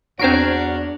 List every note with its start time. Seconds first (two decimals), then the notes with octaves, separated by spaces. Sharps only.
0.19 E2 C4 D4 F#4 A#4 C#5 C7 D7